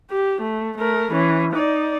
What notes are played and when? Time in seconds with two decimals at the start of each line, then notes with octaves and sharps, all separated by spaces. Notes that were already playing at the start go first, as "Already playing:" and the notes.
0.10 G4
0.41 A3
0.78 A3 A#4
1.12 E3 C#4
1.53 D#4 D5